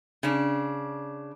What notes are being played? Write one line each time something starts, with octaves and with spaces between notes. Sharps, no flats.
C#3 D4